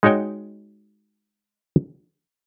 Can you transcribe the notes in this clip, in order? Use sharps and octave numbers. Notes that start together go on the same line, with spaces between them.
G#3 D#4 F#4 C#5 G5